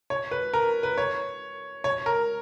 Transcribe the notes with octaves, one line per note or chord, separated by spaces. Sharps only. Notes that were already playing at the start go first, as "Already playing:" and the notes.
C#5
B4
A#4
B4
C#5
C#5
A#4